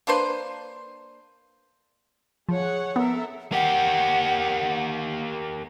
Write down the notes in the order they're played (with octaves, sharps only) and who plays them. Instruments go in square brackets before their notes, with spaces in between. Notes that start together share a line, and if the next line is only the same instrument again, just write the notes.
[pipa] A#3 D4 B4 C5
[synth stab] F3 [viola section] G#4 C#5 F#5
[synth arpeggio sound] B3 [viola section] A4 A#4 E5
[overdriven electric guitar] A#3 G4 [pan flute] F#5